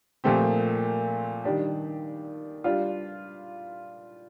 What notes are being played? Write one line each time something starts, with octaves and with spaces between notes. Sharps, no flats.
A#2 F3 A3 C4 G4
D#3 G3 D4 G4
G3 D4 F4